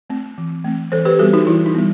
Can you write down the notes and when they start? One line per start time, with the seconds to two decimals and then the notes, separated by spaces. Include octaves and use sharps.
0.10 A3 C4
0.38 E3
0.65 A3 C4
0.92 E3 A4 C5
1.05 G4 B4
1.19 G3 B3 F#4 A4
1.33 D#4 F#4
1.47 E3 E4
1.66 D#4
1.75 G3 B3